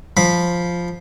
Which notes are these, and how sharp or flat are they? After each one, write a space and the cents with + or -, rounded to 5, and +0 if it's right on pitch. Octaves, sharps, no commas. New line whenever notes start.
F3 +0 B5 -10